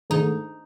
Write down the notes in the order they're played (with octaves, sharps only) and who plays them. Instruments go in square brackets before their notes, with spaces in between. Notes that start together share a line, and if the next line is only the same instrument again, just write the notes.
[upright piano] G#2 D#3 A3 [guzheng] D#4